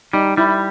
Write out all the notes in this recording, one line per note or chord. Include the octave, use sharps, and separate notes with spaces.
G3 D#4
G3 E4